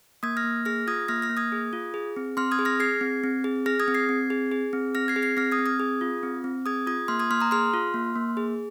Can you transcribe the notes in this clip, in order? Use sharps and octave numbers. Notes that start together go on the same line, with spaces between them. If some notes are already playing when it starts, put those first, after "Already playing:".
A#3 D#6 G#6
F6 A#6
A#3
G#4 F6 A#6
F4 D#6 G#6
A#3 F6 A#6
F6 A#6
A#3
D#6 G#6
G#4
F4
G#4
C4
C4 C6 F6
D#6 G#6
G#4
F6 A#6
G#4 G#6 C7
C4
C4
G#4
G#4 F6 A#6
D#6 G#6
C4
G#6 C7
C4
G#4
G#4
C4
C4 F6 A#6
G#6 C7
G#4
G#6 C7
C4 F6 A#6
D#6 G#6
C4
D#6 G#6
G#4
F4
C4
C4
G#4 D#6 G#6
F4 D#6 G#6
A#3 C6 F6
D#6 G#6
A#3 C6 F6
A#5 D#6
G#4 C6 F6
F4
A#3
A#3
G#4